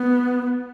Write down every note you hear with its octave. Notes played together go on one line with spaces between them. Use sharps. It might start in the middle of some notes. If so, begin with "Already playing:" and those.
Already playing: B3